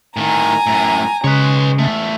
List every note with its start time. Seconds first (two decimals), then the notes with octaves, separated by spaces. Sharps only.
0.17 A2 D#3 G#5 A#5
0.67 F#2 A2
1.24 C#3 G#3 B4 C#5
1.79 E2 A3